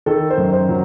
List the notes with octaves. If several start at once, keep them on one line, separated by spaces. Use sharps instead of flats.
D#3 A4
C5
F#2
C5
F#3